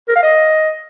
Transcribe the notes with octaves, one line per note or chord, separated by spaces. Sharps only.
A#4
F5
D#5